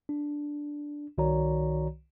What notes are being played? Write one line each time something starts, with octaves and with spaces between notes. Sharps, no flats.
D4
C2 D#3 F#4 C#5 D5 A#5